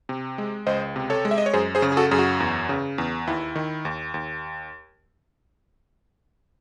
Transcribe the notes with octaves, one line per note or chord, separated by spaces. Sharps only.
C3
G#3
C#2 C5 D#5
C3
A4 C#5
G#3
E5
D#5
C#5
F#2 G#4 C5
G#4 C5
C#3
G#4
F#4 A4
F#2 G#4
F#4
E2
C#3
E2
D#2 E4
D#3
D#2
D#2